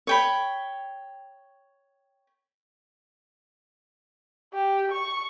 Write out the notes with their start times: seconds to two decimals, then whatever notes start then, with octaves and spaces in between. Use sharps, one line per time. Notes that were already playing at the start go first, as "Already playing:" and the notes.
0.07 C#5 G5 B5
4.54 G4
4.92 C#6